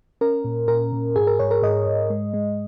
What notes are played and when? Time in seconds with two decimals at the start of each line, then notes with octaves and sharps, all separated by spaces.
0.21 C#4 A#4
0.44 A#2
0.68 A#2 A#4
0.92 A#2
1.16 G#2 G#4
1.27 A#4
1.39 G#2 C#5
1.51 A#4
1.62 G#2 D#5
1.87 G#2
2.10 G#3
2.34 G#3